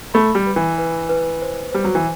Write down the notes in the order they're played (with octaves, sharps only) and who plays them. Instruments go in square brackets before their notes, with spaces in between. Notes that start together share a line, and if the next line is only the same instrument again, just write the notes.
[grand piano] A3 [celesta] B5
[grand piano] G3
[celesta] B4
[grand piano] E3
[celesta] B4
B4
C5
[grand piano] G3 [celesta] C5
[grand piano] F#3
E3